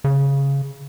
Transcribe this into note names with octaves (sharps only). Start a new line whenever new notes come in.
C#3